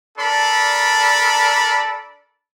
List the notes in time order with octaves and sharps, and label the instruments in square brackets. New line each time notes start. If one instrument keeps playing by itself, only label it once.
[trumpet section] D4 A4 A#4 D5 A#5 B5